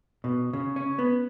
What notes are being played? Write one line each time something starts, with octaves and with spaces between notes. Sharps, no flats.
B2
C#3
C#4
B3